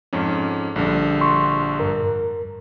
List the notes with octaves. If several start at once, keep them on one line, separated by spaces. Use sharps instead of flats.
F2 G#2 C#4
A#1 D3 G3
C6 C#6
G2 A#4